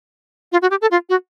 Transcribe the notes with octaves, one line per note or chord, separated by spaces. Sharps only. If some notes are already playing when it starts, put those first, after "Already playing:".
F4
F#4
G4
A4
F4
F#4